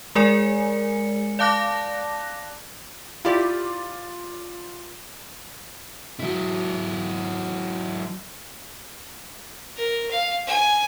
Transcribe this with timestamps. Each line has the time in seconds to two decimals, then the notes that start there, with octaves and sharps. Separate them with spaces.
0.15 G#3 G#4 A#4 D5 G#5 C#7
1.39 D5 F5 A5 D6 F#6 A#6
3.25 E4 F4 G4 D5
6.19 F#3 E4
9.77 A#4
10.10 F5
10.47 G#5